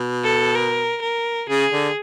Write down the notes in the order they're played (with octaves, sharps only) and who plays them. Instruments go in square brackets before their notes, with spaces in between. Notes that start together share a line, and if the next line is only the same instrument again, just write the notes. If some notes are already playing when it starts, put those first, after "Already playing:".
Already playing: [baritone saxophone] B2
[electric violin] A4
A#4
A#4
[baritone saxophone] C#3 [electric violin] G#4
[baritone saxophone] D3